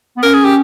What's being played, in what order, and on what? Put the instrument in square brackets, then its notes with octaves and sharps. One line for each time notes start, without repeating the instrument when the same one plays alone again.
[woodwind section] B3
[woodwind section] C#4 [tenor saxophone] A#4
[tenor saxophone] G#4
G4